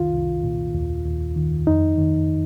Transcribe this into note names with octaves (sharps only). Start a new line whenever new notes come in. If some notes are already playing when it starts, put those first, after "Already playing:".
Already playing: C2 D#3 F4
C2
A#2
D#2
D#2
D#3
F2 D#4
D#3